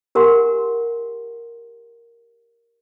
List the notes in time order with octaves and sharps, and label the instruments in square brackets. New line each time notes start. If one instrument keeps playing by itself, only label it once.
[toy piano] G4 A#4 F#5 G#5 C6